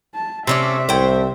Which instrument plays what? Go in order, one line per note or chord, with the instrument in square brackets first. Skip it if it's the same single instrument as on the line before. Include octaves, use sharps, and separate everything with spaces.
[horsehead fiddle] A5
[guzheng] C3 [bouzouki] A3 C#4 D5 [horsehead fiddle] E5
[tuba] C2 [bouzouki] A2 C5 G5